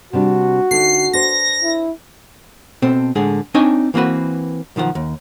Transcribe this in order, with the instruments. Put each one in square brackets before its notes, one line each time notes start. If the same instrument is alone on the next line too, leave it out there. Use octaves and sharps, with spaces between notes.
[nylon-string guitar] C3 G3 D4 [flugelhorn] F#4
[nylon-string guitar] D3 D#4 [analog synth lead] C7
[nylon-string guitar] D4 C5 [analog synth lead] A#6
[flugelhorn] E4
[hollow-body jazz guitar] B2 C4 A4
A2 D3 G#3 G#4
C4 D4 D#4 C#5 D#5 G#5
E3 A#3 C4 F#4 B4
B1 D#3 F3 F#5
D#2